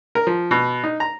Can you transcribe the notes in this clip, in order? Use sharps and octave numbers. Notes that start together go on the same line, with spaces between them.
A#4
F3
B2
D#4
A#5